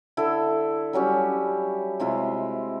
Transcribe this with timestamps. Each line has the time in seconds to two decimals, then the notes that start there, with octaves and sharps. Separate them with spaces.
0.17 D3 E4 A4
0.93 F#3 G3 C#4 G4
2.00 C3 G#3 E4 F4